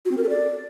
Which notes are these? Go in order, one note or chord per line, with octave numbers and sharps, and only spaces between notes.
F#4
C4
A#4
A4
D5